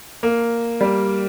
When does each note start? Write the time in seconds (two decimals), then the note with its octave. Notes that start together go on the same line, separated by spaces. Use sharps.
0.23 A#3
0.81 G3